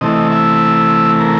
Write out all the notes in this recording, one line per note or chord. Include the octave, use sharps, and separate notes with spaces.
C3 E3 A3 D#5
E5
A#4